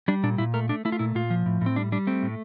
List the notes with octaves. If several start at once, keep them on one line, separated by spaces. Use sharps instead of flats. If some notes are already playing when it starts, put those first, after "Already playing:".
G3 D4
A#2 D4
A#2 E4
A3 A#4
A3 D4
A3 E4
F4
A#2 E4
A#2 F4
F3
A2
A2 C4
G3 D4
G3 D4
A3 C4
A2